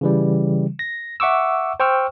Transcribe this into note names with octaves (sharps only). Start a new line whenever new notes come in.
C#3 E3 G3
A#6
E5 F#5 C#6 D6 E6
C5 G5 C#6 E6 F6